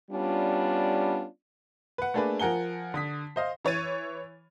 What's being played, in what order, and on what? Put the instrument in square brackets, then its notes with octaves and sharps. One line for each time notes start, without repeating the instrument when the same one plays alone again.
[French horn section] G3 B3 C#4 D4 F4
[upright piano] B4 F#5
A3 A#3 D4 G#4 B4
F3 A#4 F#5 G#5 G7
D3 D#6 B6
C5 D#5 F5
[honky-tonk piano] E3 C#5 A6 D#7